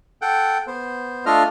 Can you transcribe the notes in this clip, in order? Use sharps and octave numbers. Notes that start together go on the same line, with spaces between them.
A4 F#5 G5
B3 C5
A3 D4 F4 A4 D#5 F6